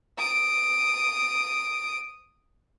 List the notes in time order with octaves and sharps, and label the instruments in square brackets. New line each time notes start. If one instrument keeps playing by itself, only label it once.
[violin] D#6 D7